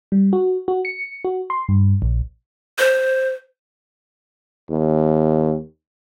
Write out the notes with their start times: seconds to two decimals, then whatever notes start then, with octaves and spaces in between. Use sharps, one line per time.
0.12 G3
0.33 F#4
0.68 F#4
0.85 C#7
1.24 F#4
1.50 C6
1.68 G2
2.02 A#1
2.78 C5
4.70 D#2